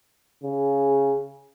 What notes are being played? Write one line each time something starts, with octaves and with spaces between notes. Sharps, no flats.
C#3